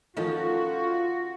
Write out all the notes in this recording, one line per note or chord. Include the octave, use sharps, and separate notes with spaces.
D#3 F3 C#4 D#4 F4 F#4 A4